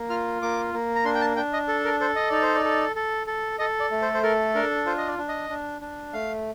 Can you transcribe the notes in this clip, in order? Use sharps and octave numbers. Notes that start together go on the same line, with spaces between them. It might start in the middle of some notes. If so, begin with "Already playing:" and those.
Already playing: A#3
F4 F6
A#3 D6
A#3
A#5
D4 C6
G5
A5
D4 G5
D#5
A4
A#4
A4 C5
D#5
D#4 D5
C5
D5
A4
A4
A4
A4 D#5
D5
A3
C5
C5
A4 A#4
D4 A#4
F4 C5
D#5
D5
D4
D#5
D4
D4
A3 F5